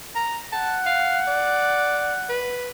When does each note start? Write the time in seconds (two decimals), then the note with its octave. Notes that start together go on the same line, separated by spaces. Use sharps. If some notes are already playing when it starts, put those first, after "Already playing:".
0.15 A#5
0.52 F#5 A5
0.86 F5
1.27 D5
2.29 B4